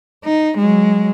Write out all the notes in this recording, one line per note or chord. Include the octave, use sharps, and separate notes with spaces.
D#4
F#3 G#3